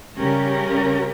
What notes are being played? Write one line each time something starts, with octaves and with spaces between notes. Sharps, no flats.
C#3 G3 C#4 G4 A#4